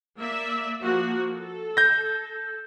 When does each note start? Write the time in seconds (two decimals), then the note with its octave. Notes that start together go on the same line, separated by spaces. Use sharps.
0.18 A#3 D5 E5
0.81 F3 A#3 F#4
1.35 A4
1.77 G6 A#6